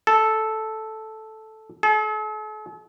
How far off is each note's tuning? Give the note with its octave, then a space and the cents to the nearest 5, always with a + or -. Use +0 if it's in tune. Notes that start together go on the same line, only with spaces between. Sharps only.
A4 -5
A4 -45